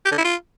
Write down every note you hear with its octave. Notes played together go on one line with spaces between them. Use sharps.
G4
D3
E4
F4